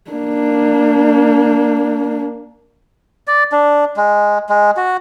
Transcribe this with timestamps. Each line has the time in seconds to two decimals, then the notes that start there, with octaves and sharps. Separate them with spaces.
0.11 A#3 D4
3.27 D5
3.52 D4
3.97 G#3
4.49 G#3
4.77 F#4